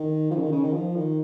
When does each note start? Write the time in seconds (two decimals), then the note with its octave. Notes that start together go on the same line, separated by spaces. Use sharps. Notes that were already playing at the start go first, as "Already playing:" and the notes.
Already playing: D#3
0.31 F3
0.36 C#3
0.42 D#3
0.52 C#3
0.64 D#3
0.74 F3
0.96 D#3